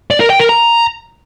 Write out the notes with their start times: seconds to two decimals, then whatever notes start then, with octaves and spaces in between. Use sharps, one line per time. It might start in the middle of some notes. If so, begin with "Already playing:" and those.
0.11 D5
0.20 A#4
0.30 G5
0.40 A#4
0.49 A#5